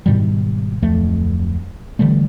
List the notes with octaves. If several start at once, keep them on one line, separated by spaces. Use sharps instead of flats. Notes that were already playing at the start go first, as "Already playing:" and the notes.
G#2 B2 D#3 G3
D1 F2 A3
D3 E3 G3 A3